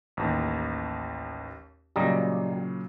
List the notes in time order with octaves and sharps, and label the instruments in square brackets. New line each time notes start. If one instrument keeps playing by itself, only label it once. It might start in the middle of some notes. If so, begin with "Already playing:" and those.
[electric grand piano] A1 D#2
[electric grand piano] A#2 C#3 F#3 [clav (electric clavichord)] G3 D#5 A#5